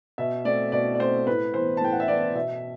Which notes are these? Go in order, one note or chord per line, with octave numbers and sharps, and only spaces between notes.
B2 E5
A3 C4 D5
B2 D5
D5
A3 C4 C5
A2 B4
E3 B3 C5
A5
A2 G5
F#5
E5
E3 B3 D5
B2 E5